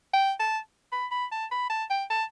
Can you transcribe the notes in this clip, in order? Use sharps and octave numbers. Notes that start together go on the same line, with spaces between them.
G5
A5
B5
B5
A5
B5
A5
G5
A5